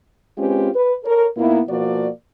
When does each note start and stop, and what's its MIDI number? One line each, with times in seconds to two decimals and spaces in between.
0.38 0.69 56
0.38 0.69 60
0.38 0.69 61
0.38 0.69 65
0.38 0.69 67
0.38 0.69 71
0.75 0.93 71
1.04 1.26 69
1.04 1.26 70
1.04 1.26 73
1.37 1.60 46
1.37 1.60 58
1.37 1.60 59
1.37 1.60 63
1.37 1.60 64
1.69 2.08 47
1.69 2.08 53
1.69 2.08 58
1.69 2.08 66
1.69 2.08 74